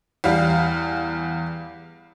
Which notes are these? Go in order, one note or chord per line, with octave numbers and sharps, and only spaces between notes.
E2 G3 F5